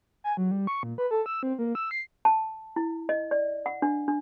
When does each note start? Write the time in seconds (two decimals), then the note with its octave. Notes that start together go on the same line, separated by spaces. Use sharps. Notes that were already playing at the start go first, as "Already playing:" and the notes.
0.24 G#5
0.37 F#3
0.51 G3
0.67 C#6
0.83 A#2
0.98 B4
1.11 A4
1.26 E6
1.43 C4
1.59 A#3
1.75 E6
1.91 C7
2.25 A5
2.76 E4
3.09 D#5
3.31 D5
3.66 F#5
3.82 D4
4.08 D4